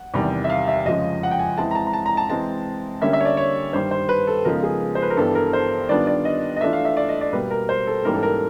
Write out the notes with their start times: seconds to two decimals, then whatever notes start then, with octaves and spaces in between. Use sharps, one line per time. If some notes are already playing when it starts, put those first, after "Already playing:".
Already playing: F#5
0.14 E2 C3 D#3 G3
0.44 E5
0.50 F5
0.68 E5
0.85 F2 C#3 F3 G#3 D#5
1.23 F#5
1.31 G5
1.39 G#5
1.57 E3 G#3 C4 E4 A5
1.71 A#5
1.75 A5
1.87 A#5
1.93 A5
2.06 A#5
2.17 A5
2.29 E3 G#3 C4 A5
3.01 D3 G3 A#3 C#4 E5
3.13 E5
3.20 C#5
3.25 D5
3.37 C#5
3.73 G2 D#3 G3 C5
3.91 C5
4.09 B4
4.27 A4
4.45 C#3 F3 G#3 B3 D#4 A#4
4.63 G#4
4.95 C5
5.02 B4
5.10 A#4
5.17 G2 E3 G3 B3 A4
5.35 A#4
5.53 C5
5.89 D#3 G3 B3 D4 F4 D5
6.07 D5
6.25 D#5
6.56 D#5
6.61 E3 A3 D4 F4 E5
6.73 F5
6.85 E5
6.97 D5
7.09 D#5
7.21 D5
7.33 B2 G3 A#3 B4
7.51 A#4
7.69 C5
7.87 A4
8.05 G#2 E3 G3 A#3 C#4 A#4
8.15 A4
8.23 A#4